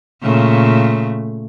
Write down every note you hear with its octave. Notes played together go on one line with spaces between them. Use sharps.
A#2 C#3 A3